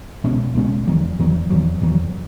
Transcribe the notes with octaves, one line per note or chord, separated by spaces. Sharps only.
C#2 B2 G#3 C#4
C#2 B2 G#3 C#4
E2 D#3 F#3
E2 D#3 F#3
E2 D#3 F#3
E2 D#3 F#3